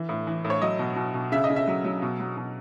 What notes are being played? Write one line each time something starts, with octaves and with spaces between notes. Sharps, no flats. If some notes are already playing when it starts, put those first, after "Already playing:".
Already playing: E3
A2
E3
A2
C#5
F#3 D#5
B2
B2
B2
C#3 E5
D#5
C#3
E5
F#3
F#3
B2
F#3
B2